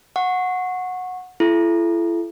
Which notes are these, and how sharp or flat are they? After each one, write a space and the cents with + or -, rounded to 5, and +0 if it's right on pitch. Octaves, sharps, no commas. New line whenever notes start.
F#5 -15 C#6 -20
E4 +40 A4 -35